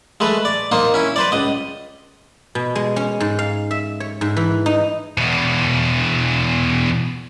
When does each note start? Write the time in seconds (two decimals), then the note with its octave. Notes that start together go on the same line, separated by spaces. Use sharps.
0.20 G#3 A3 B4
0.45 D5
0.72 A#3 D#4 C5
0.94 C#4 E4
1.16 B4 C5 D5
1.32 C#2 D#5
2.55 B2
2.75 G#3
2.96 C#4
3.20 G#2
3.39 F5
3.71 E5
4.00 C#5
4.21 G#2
4.37 E3
4.66 D#4
5.18 E2 B2